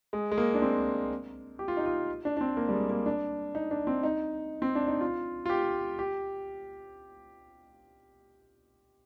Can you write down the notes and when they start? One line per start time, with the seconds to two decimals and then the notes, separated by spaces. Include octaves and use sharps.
0.13 G#3
0.32 G#3
0.38 A#3
0.54 D4
0.62 C4
1.59 G4
1.68 F4
1.77 D#4
1.86 F4
2.25 D4
2.37 D4
2.41 C4
2.57 A#3
2.69 G3
2.73 G#3
2.90 A#3
3.06 D4
3.55 D#4
3.71 D4
3.87 C4
4.03 D#4
4.62 C4
4.75 D4
4.88 D#4
5.01 F4
5.46 F4
5.50 G4
5.99 G4